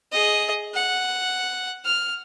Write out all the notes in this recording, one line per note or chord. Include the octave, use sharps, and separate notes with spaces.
G#4 D#5
F#5
F6